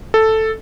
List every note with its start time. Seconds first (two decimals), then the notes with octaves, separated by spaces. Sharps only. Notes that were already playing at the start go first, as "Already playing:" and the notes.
0.14 A4